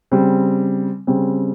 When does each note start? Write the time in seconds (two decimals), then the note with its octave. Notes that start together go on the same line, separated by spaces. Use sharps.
0.11 C#3 G3 C4
1.07 C#3 G3 C4